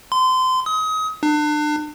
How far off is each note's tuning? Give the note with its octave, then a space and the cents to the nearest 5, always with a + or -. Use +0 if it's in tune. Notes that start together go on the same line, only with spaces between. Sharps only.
C6 -30
D#6 +30
D4 +35